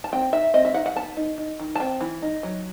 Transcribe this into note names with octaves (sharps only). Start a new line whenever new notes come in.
A5
C4 G5
D#4 E5
C4 D#5
E5
D#4 F#5
F#5
B3 A5
D#4
D#4
D#3
A5
C4 G5
E3
D#4
F#3